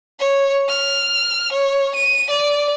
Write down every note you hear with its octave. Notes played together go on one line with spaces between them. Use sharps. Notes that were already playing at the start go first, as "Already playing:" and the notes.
C#5
F6
C#5
D#7
D5